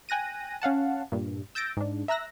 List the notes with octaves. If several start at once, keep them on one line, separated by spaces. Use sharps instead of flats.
G5 G#5 F#6 A#6 D#7
C#4 F5 F#5 A5
G2 A#2
E6 G6 A6 A#6 D7
G#2 D4
E5 A#5 E6 F#6 A#6